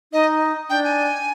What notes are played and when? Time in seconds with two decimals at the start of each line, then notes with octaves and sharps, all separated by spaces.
0.12 D#4 D#5
0.70 D4 G5
0.84 G#5